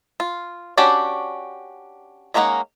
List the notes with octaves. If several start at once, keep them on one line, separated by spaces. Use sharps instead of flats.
F4
C#4 D4 F#4 G4 D5
G#3 A#3 C#4 D#4 F#5